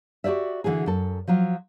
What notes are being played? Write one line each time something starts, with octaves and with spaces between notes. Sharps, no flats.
F#4 G4 C5 D5 E5
D3 E3 F#4 G#4
F#2 A4
F3 F#3 F4